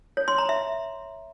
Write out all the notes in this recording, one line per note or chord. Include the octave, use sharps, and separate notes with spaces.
C#5
C6
A#5
E5